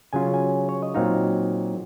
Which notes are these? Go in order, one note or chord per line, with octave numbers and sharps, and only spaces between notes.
C#3 F#3 C#4 F4 G#5
G#5
C#5
D#5
A#2 F#3 C4 D#4 F5